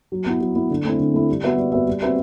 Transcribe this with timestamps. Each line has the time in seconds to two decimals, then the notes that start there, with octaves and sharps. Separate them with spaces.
0.12 F#3
0.26 B3 E4
0.41 F#3
0.55 B3 E4
0.70 D3
0.85 A3 C4 E4
1.00 D3
1.13 A3 C4 E4
1.29 G3
1.44 B3 F#4 B4 E5
1.57 G3
1.72 B3 F#4 B4 E5
1.87 G3
2.02 C4 F#4 B4 E5